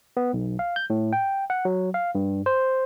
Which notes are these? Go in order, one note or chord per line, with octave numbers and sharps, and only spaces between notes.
B3
B1
F5
G6
A2
G5
F#5
F#3
F5
G2
C5